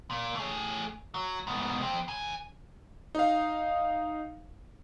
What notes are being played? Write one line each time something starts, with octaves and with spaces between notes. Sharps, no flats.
A#2
A3 G#4
F#3
G#2 B2
F2 C4
D#3 G#5
D#4 F5